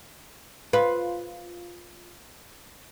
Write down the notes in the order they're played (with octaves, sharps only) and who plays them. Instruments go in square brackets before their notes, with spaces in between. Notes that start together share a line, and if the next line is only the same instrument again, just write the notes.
[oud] F4 B4